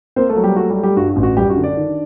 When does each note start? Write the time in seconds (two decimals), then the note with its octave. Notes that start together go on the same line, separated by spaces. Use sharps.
0.16 A#3 C4 C5
0.29 A3 A4
0.36 F#3
0.43 G3 G4
0.56 A3 F#4
0.70 G3 G4
0.76 A3
0.83 G3 G4
0.97 G2 F#4
1.09 F#4
1.16 A1
1.23 F#4
1.37 F#2 G3 G4
1.50 F#4
1.56 D3
1.64 D4 D5
1.77 D#3